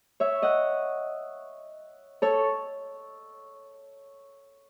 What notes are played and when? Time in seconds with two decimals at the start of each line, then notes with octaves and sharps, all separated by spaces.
0.20 C#5 E5
0.42 D#5 F#5
2.22 A4 C#5